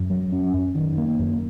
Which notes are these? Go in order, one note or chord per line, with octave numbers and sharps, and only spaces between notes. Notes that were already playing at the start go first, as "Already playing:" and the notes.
Already playing: F#2
F#3
C#4
F#2
D#3
A#3
F#2